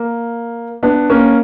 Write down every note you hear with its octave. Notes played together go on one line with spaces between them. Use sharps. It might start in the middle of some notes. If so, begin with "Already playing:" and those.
Already playing: A#3
B3 D4
A#3 C#4